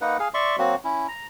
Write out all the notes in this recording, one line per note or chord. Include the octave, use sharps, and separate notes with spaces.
A#3 D#4 B4 F#5
G#4 F5
D5 E5 C6 C#6
F#3 A#3 C4 F#4
C#4 E4
A#5